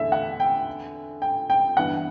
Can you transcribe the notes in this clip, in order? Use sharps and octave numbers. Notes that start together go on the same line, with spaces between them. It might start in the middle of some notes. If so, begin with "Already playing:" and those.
Already playing: E2 D3 A3 E5
F#5
G5
G5
G5
G2 E3 B3 F#5